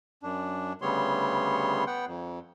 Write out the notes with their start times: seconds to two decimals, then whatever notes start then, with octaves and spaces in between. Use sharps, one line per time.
0.23 F#2 D4
0.82 D2 C#3 G3 B3 C#5 C6
1.87 B3 F#5 G5
2.07 F2